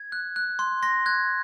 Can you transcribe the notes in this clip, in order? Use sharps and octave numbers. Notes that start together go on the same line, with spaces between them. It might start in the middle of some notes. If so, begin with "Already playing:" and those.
Already playing: G#6
F#6
F#6
C6
C6 A#6
F#6 G#6